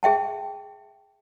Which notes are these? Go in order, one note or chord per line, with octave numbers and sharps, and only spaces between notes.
G#4 E5 G5 A5